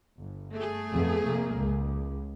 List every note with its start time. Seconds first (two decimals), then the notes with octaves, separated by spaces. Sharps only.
0.17 G1
0.53 A3 G#4
0.91 F2 B3
1.26 F1 A#3
1.55 C#2